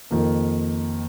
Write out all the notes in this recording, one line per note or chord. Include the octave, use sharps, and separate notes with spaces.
F2 D#3 A#3